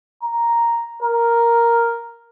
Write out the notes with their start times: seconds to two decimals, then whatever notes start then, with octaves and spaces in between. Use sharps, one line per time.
0.23 A#5
1.03 A#4